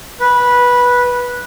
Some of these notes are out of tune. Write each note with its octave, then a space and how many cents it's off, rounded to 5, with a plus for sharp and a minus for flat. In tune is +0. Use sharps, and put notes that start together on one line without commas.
B4 -10